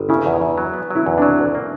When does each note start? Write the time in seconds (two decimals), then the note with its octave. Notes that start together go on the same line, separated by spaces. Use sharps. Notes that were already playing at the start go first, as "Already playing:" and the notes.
Already playing: G1
0.09 C#3 E4
0.26 E2
0.41 E2
0.58 F#3
0.74 B3
0.90 F#3 E4
1.06 E2
1.18 F#3 D4
1.39 D2
1.55 A#3